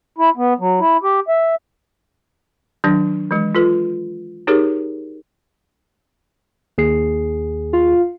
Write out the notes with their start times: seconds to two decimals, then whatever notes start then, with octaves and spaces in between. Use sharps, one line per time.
0.18 E4
0.37 B3
0.60 F#3
0.80 E4
1.03 G4
1.28 E5
2.84 D#3 F#3 D4
3.31 E3 G#3
3.55 F4 A4 B4
4.47 D#4 G4 G#4 A#4 C#5
6.78 D#2 G#4 C7
7.73 F4